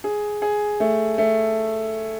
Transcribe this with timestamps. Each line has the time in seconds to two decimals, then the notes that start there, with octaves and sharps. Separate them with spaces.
0.04 G#4
0.42 G#4
0.80 A3
1.18 A3